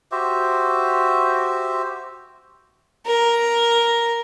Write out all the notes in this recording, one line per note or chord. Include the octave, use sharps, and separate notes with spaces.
F#4 G4 C5 E5
A#4